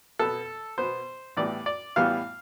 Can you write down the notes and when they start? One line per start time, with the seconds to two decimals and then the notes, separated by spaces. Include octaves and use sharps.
0.19 B2 B3 A4
0.78 B2 B3 C5
1.37 A2 E3 G3 B3 D5
1.66 D5
1.96 A2 E3 G3 B3 F5